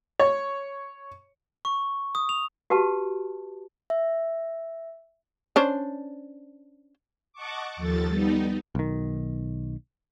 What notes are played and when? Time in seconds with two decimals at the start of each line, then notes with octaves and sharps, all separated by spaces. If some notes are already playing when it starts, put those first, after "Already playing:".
0.20 C#5
1.65 C#6
2.15 D#6
2.29 F7
2.70 F#4 G4 B4 A5
3.90 E5
5.56 C#4 D4 C5
7.33 D#5 F#5 A5 C#6 D6
7.76 D#2 F3 A4 A6
8.08 G3 B3 D#4
8.75 B1 D#3